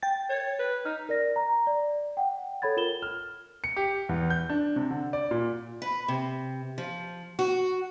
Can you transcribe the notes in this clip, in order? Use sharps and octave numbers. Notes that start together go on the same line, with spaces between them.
G5 A6
C#5
B4
D#4 F6
A#4 D5 A#6
A#5
D5
F#5 G5
A4 C#5 B5 G#6 A6
F4 A#4 E7 G7
F6
C#7
G4
E2
G6
D4
C3
D3
D5
A#2
B4
C3
F3
F#4